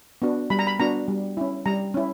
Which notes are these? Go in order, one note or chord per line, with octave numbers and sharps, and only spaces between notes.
B3 D4 F#4
G3 B5
A#5
B5
B3 D4 F#4 A#5
G3
C#4 E4
G3 A#5
C#4 E4